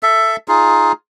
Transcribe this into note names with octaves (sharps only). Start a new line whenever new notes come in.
A4 E5
D#4 F4 G#4